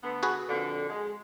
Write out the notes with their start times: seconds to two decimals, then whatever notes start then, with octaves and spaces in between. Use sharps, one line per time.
0.03 D3 A3 B3
0.23 F#4 G#4 B4
0.49 F2 A#2 D3
0.89 G#3